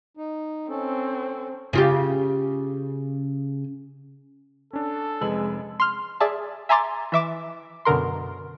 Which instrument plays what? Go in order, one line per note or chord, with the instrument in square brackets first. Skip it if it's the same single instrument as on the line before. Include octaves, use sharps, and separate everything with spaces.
[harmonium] D#4
[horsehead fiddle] C4 [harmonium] C#4 A4
[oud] C#3 F4 G4
[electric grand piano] C#4 D4 [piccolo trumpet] A4
[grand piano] F1 G#5 F#7 [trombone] G#3 [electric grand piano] B4 E6
[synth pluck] C6 F6
G#4 D5 E5 A5
E5 G#5 A#5 C6 D6 A6
E3 E5 D6 E7
F#2 B2 D3 A#4 C6